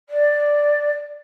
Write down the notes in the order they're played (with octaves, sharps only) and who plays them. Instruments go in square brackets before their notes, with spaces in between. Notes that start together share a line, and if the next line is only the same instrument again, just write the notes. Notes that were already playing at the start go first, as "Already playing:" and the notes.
[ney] D5